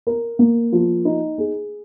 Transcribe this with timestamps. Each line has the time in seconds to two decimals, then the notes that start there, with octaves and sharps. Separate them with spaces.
0.07 A#4
0.39 A#3
0.72 F3
1.05 D#4
1.38 G#4